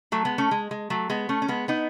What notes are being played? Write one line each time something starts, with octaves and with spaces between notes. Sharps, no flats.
F#3 A3
G#3 B3
A3 C#4
G#3
G#3
F#3 A3
G#3 B3
A3 C#4
C#4
G#3 B3
B3 D#4